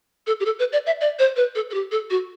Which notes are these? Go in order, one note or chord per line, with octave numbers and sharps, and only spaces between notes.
A4
G4
A4
B4
D5
E5
D5
C5
B4
A4
A4
G4
A4
F#4